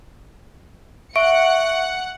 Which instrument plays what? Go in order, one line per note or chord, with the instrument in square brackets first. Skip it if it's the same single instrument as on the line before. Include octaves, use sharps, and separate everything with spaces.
[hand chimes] E5 C#6 D7 [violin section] F#5 C#7